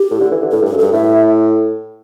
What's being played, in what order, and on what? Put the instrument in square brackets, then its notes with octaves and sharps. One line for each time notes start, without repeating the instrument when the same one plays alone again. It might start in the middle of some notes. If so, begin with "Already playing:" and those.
Already playing: [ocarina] G4
[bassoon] A2
D3
E3
D3
[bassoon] A2 [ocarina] A4
[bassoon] G2 [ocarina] A4
[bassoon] F#2
[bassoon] G2 [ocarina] A4
[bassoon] A2 [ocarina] E5